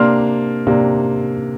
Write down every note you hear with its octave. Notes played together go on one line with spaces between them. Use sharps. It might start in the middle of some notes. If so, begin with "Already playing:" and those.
Already playing: C3 A#3 D4 C6 F6
C3 A#3 D4